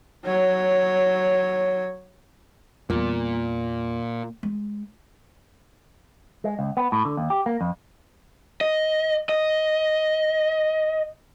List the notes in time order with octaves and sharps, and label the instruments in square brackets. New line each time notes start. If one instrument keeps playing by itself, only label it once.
[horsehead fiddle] F#3 C#5
[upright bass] E2 G3 [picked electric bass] A#2
[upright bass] G#3
[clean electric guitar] G#3
C#2
B3
A2
D3
D#2
G4
A#3
F2
[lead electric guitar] D#5
D#5